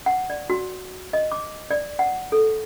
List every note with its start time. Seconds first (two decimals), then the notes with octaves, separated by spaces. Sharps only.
0.06 F#5
0.30 D5
0.50 F#4
1.13 D#5
1.32 D6
1.71 D5
1.99 F#5
2.32 A4